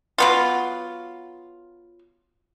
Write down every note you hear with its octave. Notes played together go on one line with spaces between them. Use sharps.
F#3 B3 F4